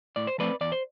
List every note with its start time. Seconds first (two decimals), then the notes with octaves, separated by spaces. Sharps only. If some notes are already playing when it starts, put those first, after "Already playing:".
0.16 A2 D5
0.27 C5
0.38 F3 A3 C4 B4 D5
0.61 E2 D5
0.72 C5